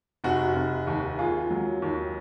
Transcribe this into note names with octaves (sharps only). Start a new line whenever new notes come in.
F1 F#4
F1
D#2
D#2 F4 G#4
F#3
D#2